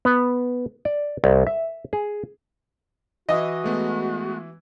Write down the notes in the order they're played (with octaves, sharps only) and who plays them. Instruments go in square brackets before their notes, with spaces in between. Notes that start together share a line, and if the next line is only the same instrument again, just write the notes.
[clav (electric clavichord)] B3
D5
C2
E5
G#4
[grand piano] E3 E4 [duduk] F#4 [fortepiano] D#5
[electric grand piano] G#3 A3 B3